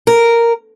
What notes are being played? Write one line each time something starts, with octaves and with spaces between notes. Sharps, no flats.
A#4